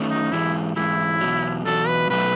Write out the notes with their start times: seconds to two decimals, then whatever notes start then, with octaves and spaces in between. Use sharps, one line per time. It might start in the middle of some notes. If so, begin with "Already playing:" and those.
Already playing: D#3 A3 C#4
0.10 D#4
0.32 G#2 E3 G#3 E4
0.76 G#2 E3 G#3 E4
1.21 E2 B2 F#3
1.65 E2 B2 F#3 A4
1.88 B4
2.10 B2 F#3 A3 B4